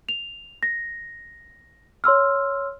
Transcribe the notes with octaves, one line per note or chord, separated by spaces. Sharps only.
F7
A#6
C#5 C6 E6 F6